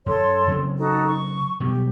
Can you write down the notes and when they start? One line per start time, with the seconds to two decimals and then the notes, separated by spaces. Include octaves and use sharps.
0.06 F#2 F#3 A4 C#5 C6
0.48 C#3 F#3 C4
0.78 D#4 F#4 A4
1.07 C#6
1.60 B2 F#3 G3 G4